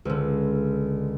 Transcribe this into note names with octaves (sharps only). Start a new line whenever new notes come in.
C#2 D3